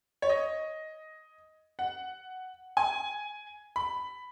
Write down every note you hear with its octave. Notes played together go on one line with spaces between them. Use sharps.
C#5
D#5
F#5
G#5
B5